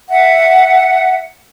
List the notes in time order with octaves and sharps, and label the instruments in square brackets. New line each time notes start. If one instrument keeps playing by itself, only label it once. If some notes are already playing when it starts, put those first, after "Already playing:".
[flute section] E5 F#5